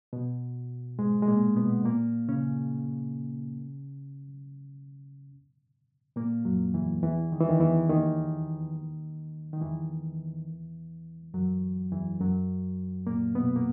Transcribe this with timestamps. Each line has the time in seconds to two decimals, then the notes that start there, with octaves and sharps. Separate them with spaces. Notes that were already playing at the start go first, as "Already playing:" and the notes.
0.13 B2
0.99 G#2 G#3
1.22 G#3
1.28 A#2 A#3
1.56 B2 B3
1.85 A#2 A#3
2.28 C#3 C#4
6.16 A#2 A#3
6.45 F#2 F#3
6.74 E2 E3
7.03 E2 E3
7.32 D#3
7.41 E3
7.49 D#2 D#3
7.60 E2 E3
7.89 D#2 D#3
9.53 D#3
9.61 E2 E3
11.34 F#2 F#3
11.92 E2 E3
12.20 F#2 F#3
13.07 A#2 A#3
13.35 B2 B3
13.56 A#3